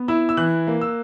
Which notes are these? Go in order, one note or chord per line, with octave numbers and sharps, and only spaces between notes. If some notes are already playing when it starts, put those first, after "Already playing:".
Already playing: B3
E4 E6
E6
E3 F#6
A#3
E6